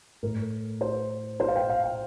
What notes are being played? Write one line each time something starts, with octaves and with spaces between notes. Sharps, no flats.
A2 A#4
C5
C5
F5
G5
F5
G5